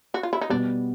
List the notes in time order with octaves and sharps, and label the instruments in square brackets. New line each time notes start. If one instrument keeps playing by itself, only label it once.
[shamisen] F#4
F4
E4
D#4
[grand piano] B2 G3 B3 [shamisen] D4